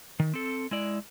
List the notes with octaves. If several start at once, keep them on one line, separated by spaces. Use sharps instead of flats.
D#3
C4 A4
G#3 E4 D5